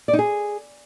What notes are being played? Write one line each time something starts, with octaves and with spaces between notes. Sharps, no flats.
D5
D#4
G#4